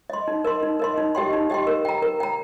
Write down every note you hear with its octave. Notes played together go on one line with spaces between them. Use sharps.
D#5 C6
D#4
A#4 D#5 C6
D#4
A#4 D#5 C6
D#4
G4 D#5 G5 C6
D#4
G4 D#5 G5 C6
A#4
G5 A#5
A#4
G5 A#5